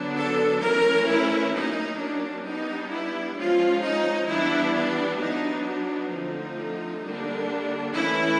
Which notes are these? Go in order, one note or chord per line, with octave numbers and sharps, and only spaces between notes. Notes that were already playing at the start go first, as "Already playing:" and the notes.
Already playing: D3 F#3 B3 D4
A4
E3 A3 C#4 A#4
E4
F#3 A#3 C#4 D#4
D4
G3 B3 D4 D#4
E4
F3 G#3 C#4 F4
D#4
E3 G3 B3 D4 E4
D4
F#3 B3 D4 D#4
D#4
D3 F3 A3 C4
D3 G3 A#3 D4
E3 A3 C#4 E4